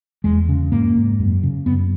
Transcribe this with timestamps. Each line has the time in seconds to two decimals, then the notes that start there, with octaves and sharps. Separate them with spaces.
0.24 E2 G#3
0.49 C#3
0.71 G#2 A#3
0.96 G#2
1.20 F#2
1.43 C#3
1.66 F#2 B3